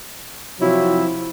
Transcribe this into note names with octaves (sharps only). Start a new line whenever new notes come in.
C3 F3 F#3 C4 E4